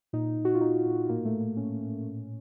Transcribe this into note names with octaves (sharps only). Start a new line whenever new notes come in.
A#2 D#4
A#2
F#4
F4
A#2 D#4
A#2
A2 A#3
A3
A2
A#3
A2 C#4
A2
A#2